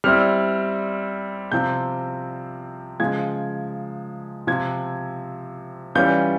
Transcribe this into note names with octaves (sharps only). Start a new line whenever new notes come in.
G3 C4 E4 F6
C3 F3 C4 G6
C#3 F3 G#3 G#6
C3 F3 C4 G#6
E3 G3 C#4 F4 G6